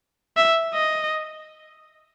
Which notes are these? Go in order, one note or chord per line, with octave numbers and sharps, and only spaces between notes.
E5
D#5